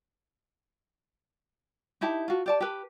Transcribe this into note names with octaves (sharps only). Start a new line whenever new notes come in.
D#4 E4 G4 A5
F4 F#4
G4 D5 A5
G4 B4